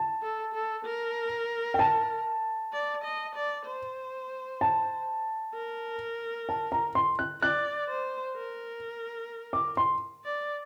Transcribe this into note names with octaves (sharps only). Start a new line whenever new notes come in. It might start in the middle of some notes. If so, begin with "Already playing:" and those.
Already playing: A5
A4
A4
A#4
G5
A5
D5
D#5
D5
C5
A5
A#4
A5
A#5
C6
F#6
D5 F#6
C5
A#4
D6
C6
D5